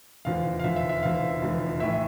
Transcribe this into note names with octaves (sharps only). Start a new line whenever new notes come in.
F1 E2 D3 F3 F5
F5
F1 E2 D3 F3 E5
E5
E5
F1 E2 D3 F3 F5
F1 E2 D3 F3
A#1 A2 E3 E5